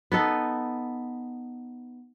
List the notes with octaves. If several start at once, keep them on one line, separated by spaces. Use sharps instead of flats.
B3 D#4 A4 B4